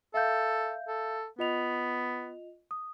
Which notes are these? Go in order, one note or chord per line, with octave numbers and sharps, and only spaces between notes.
A4 E5 F5 G6
A4
B3 F4 D#5 F7
D#6